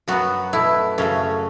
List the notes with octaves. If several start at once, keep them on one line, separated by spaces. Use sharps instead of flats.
F#2 F#3 B3 F#4
B2 A3 E4
F#2 C#3 A3 C#4